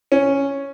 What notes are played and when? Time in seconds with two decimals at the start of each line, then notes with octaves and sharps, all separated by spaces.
0.12 C#4